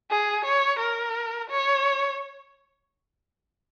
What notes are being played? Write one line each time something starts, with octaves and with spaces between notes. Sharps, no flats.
G#4
C#5
A#4
C#5